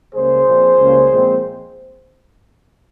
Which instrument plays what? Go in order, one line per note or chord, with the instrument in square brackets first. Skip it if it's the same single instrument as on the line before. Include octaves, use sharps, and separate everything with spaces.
[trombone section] C#2 C#3 G3 A#3 G#4 C5
A#2 F3 C4
C#2 C#3 G3 A#3
A#2 F3 G#3 C4